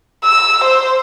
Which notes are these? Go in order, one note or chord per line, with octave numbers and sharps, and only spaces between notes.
E6
C5